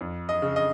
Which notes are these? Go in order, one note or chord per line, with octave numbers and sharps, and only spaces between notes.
F2
D#5
C#3
D#5